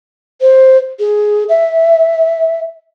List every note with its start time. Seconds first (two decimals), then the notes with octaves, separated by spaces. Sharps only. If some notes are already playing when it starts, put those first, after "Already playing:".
0.41 C5
1.00 G#4
1.49 E5